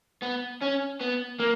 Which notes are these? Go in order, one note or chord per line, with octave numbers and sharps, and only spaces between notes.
B3
C#4
B3
A#3